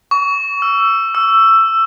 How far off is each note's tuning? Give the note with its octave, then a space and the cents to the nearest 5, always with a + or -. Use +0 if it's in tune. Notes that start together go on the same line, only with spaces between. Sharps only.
C#6 +30
E6 +20
E6 +15